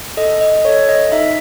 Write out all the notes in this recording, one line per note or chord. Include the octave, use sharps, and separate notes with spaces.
A4 D#5
D#5
A4 C#5
D#5
D#4 E5